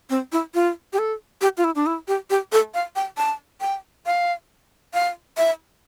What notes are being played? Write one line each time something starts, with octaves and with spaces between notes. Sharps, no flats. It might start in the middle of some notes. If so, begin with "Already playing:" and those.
C4
E4
F4
G4
A4
G4
F4
E4
D4
E4
G4
G4
A4
F5
G5
A5
G5
F5
F5
E5